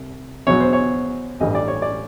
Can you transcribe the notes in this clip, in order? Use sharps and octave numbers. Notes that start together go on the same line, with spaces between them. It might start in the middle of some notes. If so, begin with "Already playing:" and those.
Already playing: C2
E2 B2 F#3 C#5
C5
C#5
A1 G2 E3 D#5
D5
C#5
D5